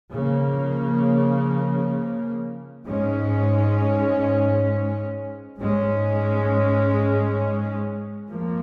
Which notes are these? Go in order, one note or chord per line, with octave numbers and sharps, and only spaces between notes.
C#3 F3 A#3
G#2 G#3 C#4
G#2 G#3 C#4
F2 F3 A#3